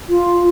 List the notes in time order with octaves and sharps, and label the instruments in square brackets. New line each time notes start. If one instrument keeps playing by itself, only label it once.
[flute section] F4